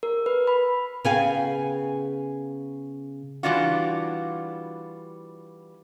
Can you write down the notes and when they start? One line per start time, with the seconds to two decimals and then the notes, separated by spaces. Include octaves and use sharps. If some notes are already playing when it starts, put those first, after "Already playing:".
0.03 A#4
0.26 B4
0.47 B5
1.04 C#3 B3 G#4 F5 G5 G#5
3.43 E3 G3 D4 F4 F#4